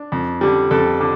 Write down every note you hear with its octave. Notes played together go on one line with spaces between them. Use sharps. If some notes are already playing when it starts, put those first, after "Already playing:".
Already playing: D4
F2
D3 G3
F2 A4
D3